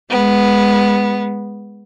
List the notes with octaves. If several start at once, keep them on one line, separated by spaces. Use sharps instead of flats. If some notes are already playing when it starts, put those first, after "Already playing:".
G#3 B3